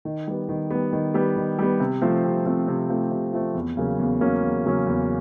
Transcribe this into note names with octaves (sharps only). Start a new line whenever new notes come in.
D#3
G3 B3
D#3
G3 B3
D#3
G3 B3
D#3
G3 B3
C3
F3 A3 C4
C3
F3 A3 C4
C3
F3 A3 C4
C3
F3 A3 C4
E2
C#3 F#3 A#3 C#4
E2
C#3 F#3 A#3 C#4
E2
C#3 F#3 A#3 C#4
E2